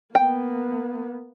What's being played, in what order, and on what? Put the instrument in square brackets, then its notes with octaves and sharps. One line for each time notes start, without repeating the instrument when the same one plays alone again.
[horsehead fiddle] A#3 B3 [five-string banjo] G5